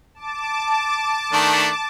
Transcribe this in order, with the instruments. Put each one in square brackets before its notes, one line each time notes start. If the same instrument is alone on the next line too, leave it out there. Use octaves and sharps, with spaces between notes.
[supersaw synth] A5 D6
[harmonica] D#3 A3 D4